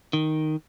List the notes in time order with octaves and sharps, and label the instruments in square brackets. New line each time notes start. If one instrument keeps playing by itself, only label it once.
[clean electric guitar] D#3